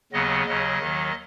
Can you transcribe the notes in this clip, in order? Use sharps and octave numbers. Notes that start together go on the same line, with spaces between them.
D#2 C#3 F#3 B3 D#5
D#2 C#3 F#3 D#5
D#2 D#3 F#3